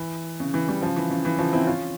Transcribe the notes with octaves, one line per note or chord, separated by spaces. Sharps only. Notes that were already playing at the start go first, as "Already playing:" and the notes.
Already playing: E3
C#3
E3
E3 G3
C#3 F3
E3
C#3
E3
C#3 F3
C4 E4
C#4 F4